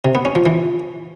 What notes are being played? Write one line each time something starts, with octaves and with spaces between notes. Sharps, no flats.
C3
B3
C#4
F3
E3